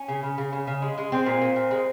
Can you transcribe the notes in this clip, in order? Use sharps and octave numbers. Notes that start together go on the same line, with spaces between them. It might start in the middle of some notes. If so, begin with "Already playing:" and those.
Already playing: C#4
C#3
C#3
C#3
C#3
C#3
G#3
G#3
G#3 C4
A#2
A#2
A#2
G#3